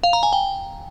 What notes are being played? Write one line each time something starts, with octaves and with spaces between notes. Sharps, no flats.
F5
A#5
G#5
G5